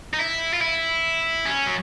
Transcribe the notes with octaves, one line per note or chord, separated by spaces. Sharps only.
D#4
E4
F4
E4
C#4
F#3